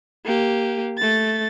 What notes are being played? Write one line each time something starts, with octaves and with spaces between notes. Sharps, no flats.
A#3 G4
A3 A6